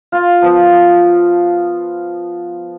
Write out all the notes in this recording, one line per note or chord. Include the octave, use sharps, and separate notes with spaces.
F4
F3 B3